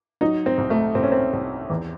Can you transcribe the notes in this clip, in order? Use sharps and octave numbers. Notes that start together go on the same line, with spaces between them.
F#3 D#4
C4
C2
A3
C2 C4
C#4
C4
C2
E2